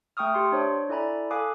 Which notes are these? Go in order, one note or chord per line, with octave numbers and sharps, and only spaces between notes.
A3 G5 C#6 D#6 F6
G4 C6
D4 C5 C#5 C#6
E4 A4 D5 G#5 A#5 B5
A4 F5 G#5 D6 D#6 F#6